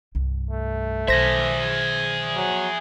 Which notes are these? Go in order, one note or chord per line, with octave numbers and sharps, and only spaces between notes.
C2 G2
A3
B1 D#3 G#4 C5 E5 A#6
F#3